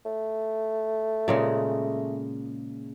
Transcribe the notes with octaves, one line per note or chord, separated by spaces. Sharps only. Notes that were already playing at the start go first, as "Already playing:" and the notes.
A3
A#2 C#3 G#3